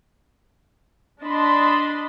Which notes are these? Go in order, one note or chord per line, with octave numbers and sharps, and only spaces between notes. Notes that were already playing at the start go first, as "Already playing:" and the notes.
D4 D#5 A5 B5 C6